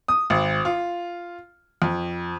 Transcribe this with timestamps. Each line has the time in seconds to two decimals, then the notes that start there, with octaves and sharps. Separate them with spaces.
0.08 D#6
0.30 G#1
0.65 F4
1.82 F2